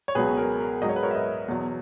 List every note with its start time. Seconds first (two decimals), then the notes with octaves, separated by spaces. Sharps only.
0.08 C#5
0.15 C#2 B2 F#3 G#4 B4
0.37 A#4
0.60 A#4
0.82 G#2 F#3 D#5
0.89 C#5
0.96 B4
1.03 A#4 C#5
1.11 E5
1.15 B4 D#5
1.48 E2 B2 F#3